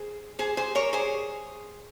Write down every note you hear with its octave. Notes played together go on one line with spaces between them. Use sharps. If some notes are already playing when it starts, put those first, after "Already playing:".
Already playing: G#4 C5
G#4 C5
G#4 C5
A#4 C#5
G#4 C5